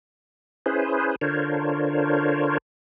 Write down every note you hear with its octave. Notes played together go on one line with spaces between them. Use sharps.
C#4 E4 G#4 B4 C5
D3 D4 F4 A#4 C5 C#5